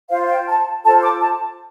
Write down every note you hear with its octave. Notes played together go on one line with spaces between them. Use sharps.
F4 C5 F5
G5
A5
F4 A4 C5 A5
D6
A5